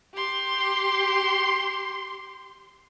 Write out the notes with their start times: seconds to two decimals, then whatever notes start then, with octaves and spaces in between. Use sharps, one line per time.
0.14 G4 C6